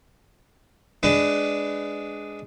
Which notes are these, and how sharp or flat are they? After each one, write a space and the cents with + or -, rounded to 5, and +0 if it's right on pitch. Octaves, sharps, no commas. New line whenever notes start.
G#3 +0 D4 +0 B4 +20